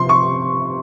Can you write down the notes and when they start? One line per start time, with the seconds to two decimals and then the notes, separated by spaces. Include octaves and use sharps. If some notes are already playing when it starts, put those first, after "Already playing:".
Already playing: C3 F3 C6
0.09 C#6